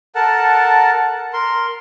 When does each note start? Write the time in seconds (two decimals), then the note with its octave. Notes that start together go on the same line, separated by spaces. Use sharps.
0.15 A4 A#4 F#5 A5
1.33 A#4 C6